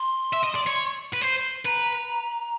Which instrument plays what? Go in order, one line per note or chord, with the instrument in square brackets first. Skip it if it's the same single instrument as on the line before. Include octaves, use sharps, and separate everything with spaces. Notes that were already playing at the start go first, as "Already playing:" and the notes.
Already playing: [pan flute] C6
[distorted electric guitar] E5
D#5
D5
C#5
B4
C5
[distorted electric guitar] B4 [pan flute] A#5